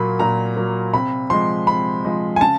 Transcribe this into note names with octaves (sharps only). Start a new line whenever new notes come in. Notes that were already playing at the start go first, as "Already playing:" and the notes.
Already playing: A#2 F#3 A#3 B5
A#2 A#5
F#3 A#3
C3 B5
F3 G#3 C6
C3 B5
F3 G#3
G#5
C#3 A5